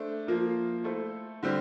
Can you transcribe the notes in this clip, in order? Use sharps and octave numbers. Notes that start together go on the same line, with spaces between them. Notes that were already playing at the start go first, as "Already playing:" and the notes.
Already playing: A3 D4 C5
F3 A#3 F4 A#4
A3 E4 A4 C5
D3 G3 C4 G4